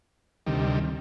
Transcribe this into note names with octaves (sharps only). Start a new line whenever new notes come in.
D2 C3 D#3 G3